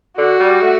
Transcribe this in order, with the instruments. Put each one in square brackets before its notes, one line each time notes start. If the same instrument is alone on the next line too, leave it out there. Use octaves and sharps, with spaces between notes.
[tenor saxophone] D3 [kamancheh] F#4
[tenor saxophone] G3
A3